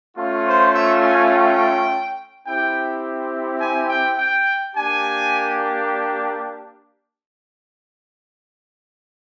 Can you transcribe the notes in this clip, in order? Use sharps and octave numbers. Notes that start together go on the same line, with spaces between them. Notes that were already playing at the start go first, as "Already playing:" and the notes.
A3 C#4 F4
C5
E5
G#5
G5
C4 E4 G4 G5
G#5
G5
G5
A#3 D4 G4 G#5